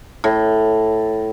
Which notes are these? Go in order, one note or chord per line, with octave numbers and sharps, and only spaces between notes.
A2